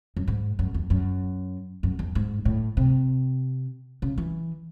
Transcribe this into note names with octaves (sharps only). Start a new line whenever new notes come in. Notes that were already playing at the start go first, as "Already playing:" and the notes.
F#2
G#2
F#2
E2
F#2
F#2
E2
G#2
A2
C3
C#3
E3